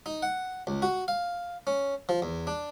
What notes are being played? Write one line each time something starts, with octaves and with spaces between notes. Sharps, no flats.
D#4
F#5
C#2
F#4
F5
C#4
F3
E2
D4